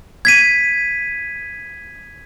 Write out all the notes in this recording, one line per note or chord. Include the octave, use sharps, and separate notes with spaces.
G#6 B6 D#7